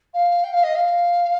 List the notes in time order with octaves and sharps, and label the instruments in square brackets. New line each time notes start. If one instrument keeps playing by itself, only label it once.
[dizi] F5
G5
F5
D#5
F5